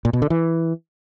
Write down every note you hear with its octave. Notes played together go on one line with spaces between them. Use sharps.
A#2
B2
D3
E3